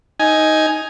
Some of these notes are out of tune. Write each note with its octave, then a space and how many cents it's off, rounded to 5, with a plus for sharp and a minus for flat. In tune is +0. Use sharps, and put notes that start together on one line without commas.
D#4 +10 G#5 +0